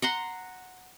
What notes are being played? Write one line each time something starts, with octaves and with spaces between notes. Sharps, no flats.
F#5 A#5 C6